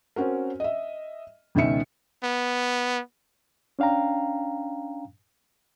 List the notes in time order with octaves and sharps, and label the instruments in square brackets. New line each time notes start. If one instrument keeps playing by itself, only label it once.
[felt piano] C4 C#4 F#4 A#4
D#5 E5
C#2 B2 D#3 C#4 E5 C#7
[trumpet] B3
[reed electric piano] C#4 D4 F5 G5 A#5